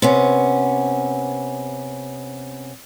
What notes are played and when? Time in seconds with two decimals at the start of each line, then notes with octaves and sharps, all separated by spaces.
0.02 C3 B3 C#4